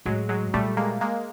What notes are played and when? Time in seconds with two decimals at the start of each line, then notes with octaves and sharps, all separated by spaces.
0.06 A2 F#3 G#3
0.29 F#3 G#3
0.54 A#2 G3 A3
0.77 G#3 A#3
1.01 G#3 A#3